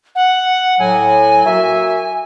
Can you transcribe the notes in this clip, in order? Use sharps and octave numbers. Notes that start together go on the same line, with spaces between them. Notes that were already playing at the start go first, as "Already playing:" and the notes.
F#5
A2 F#3 G#5
A#3 F#4 E5